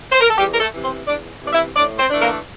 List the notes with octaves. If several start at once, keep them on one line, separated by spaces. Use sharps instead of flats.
C5
A#4
A4
E2 G3 G4
A#4
A3 A4
C3 E3
C4 C5
E2 D4 D5
C3 E3 D5
E4 E5
A2 D4 D5
C4 C5
E3 A3 D4
A#3 A#4